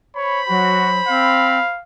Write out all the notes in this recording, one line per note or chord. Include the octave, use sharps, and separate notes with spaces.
C5 C#5 B5
F#3 F#4
C4 F5